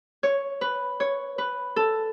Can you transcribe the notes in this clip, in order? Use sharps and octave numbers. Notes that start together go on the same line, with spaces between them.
C#5
B4
C#5
B4
A4